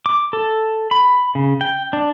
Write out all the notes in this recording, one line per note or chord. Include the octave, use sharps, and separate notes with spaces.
D6
A4
B5
C#3
G5
D4